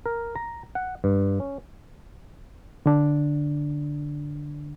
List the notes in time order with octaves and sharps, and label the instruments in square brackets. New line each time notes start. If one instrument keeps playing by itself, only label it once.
[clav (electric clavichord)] A#4
A#5
F#5
G2
C#4
[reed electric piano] D3 D4